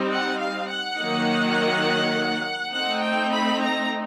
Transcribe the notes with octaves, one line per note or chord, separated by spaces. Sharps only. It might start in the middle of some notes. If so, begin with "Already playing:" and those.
Already playing: G3 C4 D#4
F#5
F5
F#5
D#3 F#3 A#3 D#4
A3 C4 D#4 F#5
G5
B5
A#5